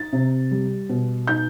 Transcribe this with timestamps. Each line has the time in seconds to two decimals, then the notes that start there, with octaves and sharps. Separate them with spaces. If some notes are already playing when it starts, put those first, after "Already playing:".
Already playing: D#4 A6
0.13 C3
0.51 G3
0.89 B2
1.27 D#4 G6